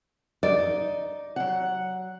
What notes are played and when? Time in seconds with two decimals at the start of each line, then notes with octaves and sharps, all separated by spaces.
0.43 D#4 D5
1.36 F#3 F#5